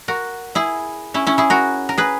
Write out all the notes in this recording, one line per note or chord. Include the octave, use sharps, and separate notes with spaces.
F#4 A#4
E4 G#4
C#4 E4
C#4 E4
E4 G#4
F#4 A#4
A#4
G#4 B4